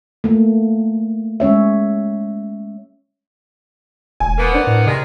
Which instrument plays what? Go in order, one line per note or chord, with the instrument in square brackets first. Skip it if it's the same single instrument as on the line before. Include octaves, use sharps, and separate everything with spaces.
[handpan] A3 A#3
G#3 C#4 C#5 E5
[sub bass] E1 [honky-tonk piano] G#5
[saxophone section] A#3 B3
[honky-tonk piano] D4 C5
[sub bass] A2
[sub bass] C3 [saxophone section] D#3 G#3